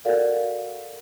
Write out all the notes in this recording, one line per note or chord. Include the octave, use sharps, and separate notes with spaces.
F#4 A4 A#4 D5 F5 F#5